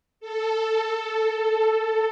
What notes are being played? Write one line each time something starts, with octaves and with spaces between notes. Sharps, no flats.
A4